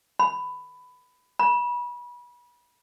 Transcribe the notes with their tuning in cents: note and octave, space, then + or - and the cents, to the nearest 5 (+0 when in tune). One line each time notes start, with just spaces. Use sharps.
B5 +15
B5 -30